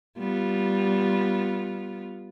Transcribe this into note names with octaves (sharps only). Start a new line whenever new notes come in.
G3 B3 F4